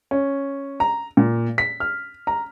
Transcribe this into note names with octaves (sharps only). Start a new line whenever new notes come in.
C#4
A#5
A#2
B6
F6
A#5